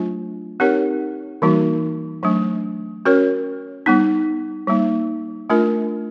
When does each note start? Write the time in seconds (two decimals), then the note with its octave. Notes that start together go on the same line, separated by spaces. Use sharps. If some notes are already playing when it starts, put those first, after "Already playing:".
Already playing: F#3 A3 D4 F4
0.60 C4 D#4 G4 A#4 C#5
1.42 E3 G3 A#3 D#4 F#4
2.23 F#3 A3 D4
3.05 C#4 F#4 A#4 C#5
3.86 G3 B3 D#4
4.67 G3 A#3 D#4
5.50 A3 D4 F4 A#4